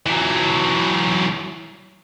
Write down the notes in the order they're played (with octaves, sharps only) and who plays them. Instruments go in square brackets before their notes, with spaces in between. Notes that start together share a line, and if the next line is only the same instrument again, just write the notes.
[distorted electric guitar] E3 F#3